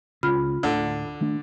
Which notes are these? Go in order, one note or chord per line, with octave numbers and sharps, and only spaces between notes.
C#2 C#3 F4 B5 F6
D2 A2 D3
D#3 A3 D4